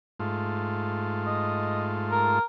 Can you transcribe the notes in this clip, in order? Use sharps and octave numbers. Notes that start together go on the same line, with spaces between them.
G#2 A3 F4
D#5
A#4